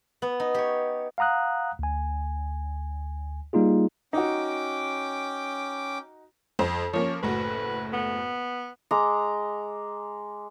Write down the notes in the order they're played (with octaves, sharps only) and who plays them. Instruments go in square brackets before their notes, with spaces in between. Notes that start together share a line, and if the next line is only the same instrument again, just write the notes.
[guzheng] B3
D#4
G4 C#5
[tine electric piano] F5 F#5 A#5 D#6 F#6
D2 G#5
G3 A#3 D#4 F4 G#4
[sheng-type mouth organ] C#4 G5 D6 [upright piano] D#4 F#4
[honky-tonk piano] F2 C5
[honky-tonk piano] F3 A#3 C#4 [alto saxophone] C#5
[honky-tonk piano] F#1 A2 F#4 [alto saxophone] B4
[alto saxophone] B3
[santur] G#3 A#5 D6